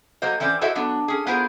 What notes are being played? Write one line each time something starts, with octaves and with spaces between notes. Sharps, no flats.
F#3 A#3 C5 D#5
E3 C4 C#4 C5 D5
E4 F#4 A4 C5 D#5 E5
F#3 B3 D4
C#4 G#4
B3 E4 F4 G#4 A#4 C5